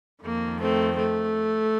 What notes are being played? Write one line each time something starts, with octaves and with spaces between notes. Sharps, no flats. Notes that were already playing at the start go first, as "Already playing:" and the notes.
F2 D#3 A#3
A3 C4
A3